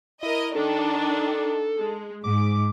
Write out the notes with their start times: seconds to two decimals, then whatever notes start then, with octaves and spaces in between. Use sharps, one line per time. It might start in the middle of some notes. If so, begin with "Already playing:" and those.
0.23 E4 A#4 D#5
0.55 D#3 D4 A4
1.77 G#3
2.24 G#2 D6